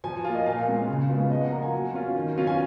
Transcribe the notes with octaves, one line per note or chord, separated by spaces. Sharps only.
F3 G#5
A#3 F4
D#5
A#2 F5
G#3 C#4 F4
C#3
G#3 B3 F4
F3 D#5
F#5
A#3 F4 A#5
G#5
F#3
C#4 F4
D#3
F#3 C#4 F4
G#5